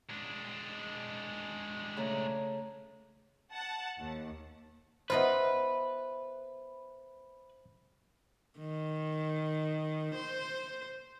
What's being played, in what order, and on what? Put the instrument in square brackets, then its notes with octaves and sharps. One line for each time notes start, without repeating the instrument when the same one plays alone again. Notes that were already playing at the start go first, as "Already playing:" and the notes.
[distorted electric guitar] G#3 D4
[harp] C#3 A3 A#5
[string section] F#5 A5
D#2
[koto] B3 D#4 F4 [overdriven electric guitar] B4 [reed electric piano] C5 E5
[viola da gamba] D#3
C5